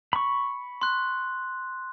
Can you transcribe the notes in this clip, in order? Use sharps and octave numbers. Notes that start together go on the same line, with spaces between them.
B5 C#6
C6 F#6